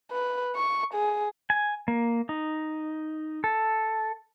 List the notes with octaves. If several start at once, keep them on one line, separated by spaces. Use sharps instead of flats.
B4
C#6
G#4
G#5
A#3
D#4
A4